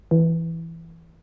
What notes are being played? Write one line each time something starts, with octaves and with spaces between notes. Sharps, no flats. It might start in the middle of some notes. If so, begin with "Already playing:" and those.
E3